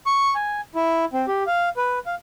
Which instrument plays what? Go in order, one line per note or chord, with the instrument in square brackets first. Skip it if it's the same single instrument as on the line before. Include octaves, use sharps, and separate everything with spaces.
[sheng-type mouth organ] C#6
G#5
E4
C4
G4
F5
B4
F5